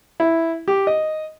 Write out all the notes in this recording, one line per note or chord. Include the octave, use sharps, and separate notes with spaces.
E4
G4
D#5